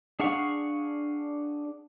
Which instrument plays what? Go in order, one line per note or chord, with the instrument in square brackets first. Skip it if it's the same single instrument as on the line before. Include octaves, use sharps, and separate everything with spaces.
[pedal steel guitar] D4 G#4 F5 F#5 C#6